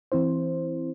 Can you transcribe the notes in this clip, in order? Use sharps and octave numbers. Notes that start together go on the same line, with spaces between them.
E3 C4 E4 C5